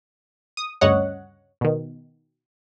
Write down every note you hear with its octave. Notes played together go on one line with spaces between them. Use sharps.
D#6
D2 G2 C#3 C#5 D#5 F#5
B2 D#3